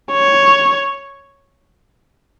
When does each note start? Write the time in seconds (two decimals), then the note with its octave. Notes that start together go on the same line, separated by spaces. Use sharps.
0.13 C#5